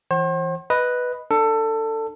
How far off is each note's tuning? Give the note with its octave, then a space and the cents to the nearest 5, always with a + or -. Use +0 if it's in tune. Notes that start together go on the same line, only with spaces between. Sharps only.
E3 +5 C5 +40 F#5 +40
B4 +0 D#5 +0
D4 +30 A4 +20